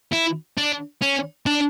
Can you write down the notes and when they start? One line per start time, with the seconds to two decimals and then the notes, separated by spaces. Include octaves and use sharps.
0.13 E4
0.58 D4
1.02 C#4
1.46 D4